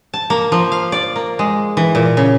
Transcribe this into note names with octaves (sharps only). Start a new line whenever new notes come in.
A5
A#3
F3
F5
D5
A#3
G#3
E3
A#2
C#3